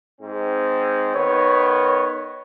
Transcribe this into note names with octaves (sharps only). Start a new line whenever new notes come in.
G#2 C4
D#3 B3 C#5